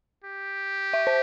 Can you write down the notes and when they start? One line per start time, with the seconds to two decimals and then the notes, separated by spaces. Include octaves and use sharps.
0.24 G4
0.93 E5
1.07 C5